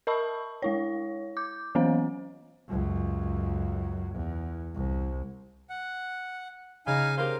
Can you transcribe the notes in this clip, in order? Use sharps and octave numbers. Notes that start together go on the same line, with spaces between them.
A#4 D#5 A5 B5 C#6 E6
G#3 E4 C#5
D6 G6
E3 F#3 B3 C#4 C5 F5
C#2 F#2
E2
C2
F#5
C#3 D#4 F5 G#5
G4 A#4 C5 F5